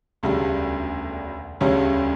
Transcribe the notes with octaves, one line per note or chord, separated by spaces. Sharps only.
E1 D2 C#3 G3
E1 D2 C#3 G3 C#4